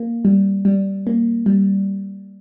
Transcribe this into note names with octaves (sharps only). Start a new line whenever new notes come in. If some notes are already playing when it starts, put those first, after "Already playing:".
Already playing: A#3
G3
G3
A#3
G3